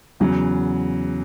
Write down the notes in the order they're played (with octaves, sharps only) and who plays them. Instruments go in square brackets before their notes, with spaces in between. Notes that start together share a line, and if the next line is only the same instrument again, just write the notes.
[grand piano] E2 C#3 F#3